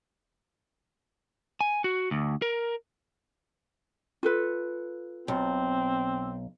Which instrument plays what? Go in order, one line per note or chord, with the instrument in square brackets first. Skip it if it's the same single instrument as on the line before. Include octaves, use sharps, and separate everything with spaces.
[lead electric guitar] G#5
F#4
D2
A#4
[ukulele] F4 A4 B4
[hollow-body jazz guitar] B1 [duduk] C4